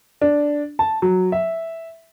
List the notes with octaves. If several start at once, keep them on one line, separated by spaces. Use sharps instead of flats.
D4
A5
F#3
E5